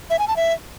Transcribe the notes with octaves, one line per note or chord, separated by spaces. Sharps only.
E5
G#5
A5
E5